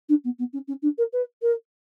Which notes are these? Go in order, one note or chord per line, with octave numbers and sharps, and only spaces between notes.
D4
B3
B3
C#4
C#4
D4
A#4
B4
A#4